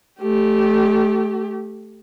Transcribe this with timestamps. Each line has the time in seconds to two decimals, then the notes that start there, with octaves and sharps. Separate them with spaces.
0.21 A3 G4